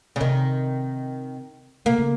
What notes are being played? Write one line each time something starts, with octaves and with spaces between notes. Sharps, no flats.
C#3
C3 D#3
C3 A#3
C#3